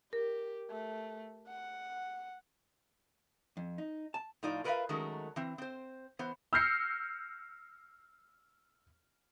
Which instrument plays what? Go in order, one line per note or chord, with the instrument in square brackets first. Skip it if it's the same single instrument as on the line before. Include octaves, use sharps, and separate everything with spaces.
[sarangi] G4 [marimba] A#4
[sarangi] A3
F#5
[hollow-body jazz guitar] F2
D#4
A5
[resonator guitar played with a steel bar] A2 F3 D#4 F4 D5
F4 A#4 B4 C#5 E5 F5
D#3 F#3 G#3 A3 C#4 A#4
E3 C4
C4 C5
E3 B3 C5
[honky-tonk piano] E6 F6 G6 A#6 C7 C#7